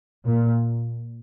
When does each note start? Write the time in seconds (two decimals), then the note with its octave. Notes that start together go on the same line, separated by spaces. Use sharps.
0.25 A#2